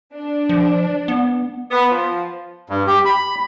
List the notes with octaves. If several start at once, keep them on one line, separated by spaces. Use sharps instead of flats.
D4
F3
B3
B3
F3
G2
G4
B5